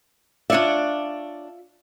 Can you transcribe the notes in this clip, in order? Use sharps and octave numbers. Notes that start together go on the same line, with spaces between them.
D4 F4 C#5 D5 E5